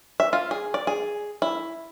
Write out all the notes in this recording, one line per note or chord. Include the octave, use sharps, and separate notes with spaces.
E5
F4
G#4
D5
G#4
E4